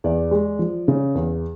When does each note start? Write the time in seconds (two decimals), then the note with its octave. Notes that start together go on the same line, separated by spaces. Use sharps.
0.04 E2 D5
0.31 G#3
0.59 F3
0.88 C#3
1.15 E2